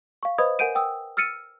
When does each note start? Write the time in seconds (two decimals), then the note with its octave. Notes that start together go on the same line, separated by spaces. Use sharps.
0.23 F5 C#6
0.38 B4 C5 D#5 B5 D#6 G#6
0.59 A#4 F#5 G#5 G6 D7 D#7
0.75 G5 D#6 E6
1.17 E6 F6 A6 C#7 D#7